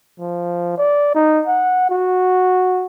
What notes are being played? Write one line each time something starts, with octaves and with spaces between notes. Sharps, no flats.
F3
D5
D#4
F#5
F#4